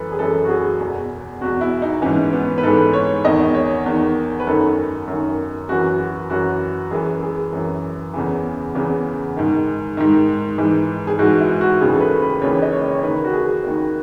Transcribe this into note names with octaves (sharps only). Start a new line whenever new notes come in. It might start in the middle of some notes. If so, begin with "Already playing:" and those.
Already playing: F#2 E3 A4 B4
G#4
F#2 E3 A4
F#4
G#4
E2 B2
E2 B2 F#4
E4
D#4
G#2 E3 C#4
B3
B4
G#2 E3 A4
C#5
E2 D#3 D#5
C#5
E2 D#3
B4
F#2 D#3 A4
F#2 D#3
F#2 E3 F#4
F#4
F#2 E3 F#4
F#2 E3 G#4
G#4
F#2 E3
E2 C#3 E3
E2 C#3 E3
G#2 D#3
G#2 D#3
G#2 E3
G#4
G#2 E3 F#4
E4
F#4
D#2 C#3 E3 G#4
A4
B4
B4
D#2 C#3 E3 C#5
D#5
C#5
C#5
D#2 D#3 B4
F#4
G#4
D#2 D#3